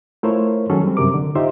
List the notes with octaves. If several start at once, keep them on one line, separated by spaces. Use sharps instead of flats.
A3 E4 F4 A#4 C5 C#5
D#3 F#3 C#4 G#4 A4
G3 C4
F#2 C3 A#4 D6
D3
D#4 F4 G4 C5 E5